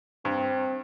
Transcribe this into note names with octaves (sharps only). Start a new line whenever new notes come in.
G2 C4